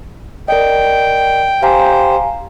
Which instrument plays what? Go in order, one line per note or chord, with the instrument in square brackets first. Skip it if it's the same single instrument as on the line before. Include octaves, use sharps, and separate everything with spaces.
[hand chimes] A#4 D5 D#5 [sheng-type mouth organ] G5
[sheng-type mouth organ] G4 C5 [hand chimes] F5 G#5 A#5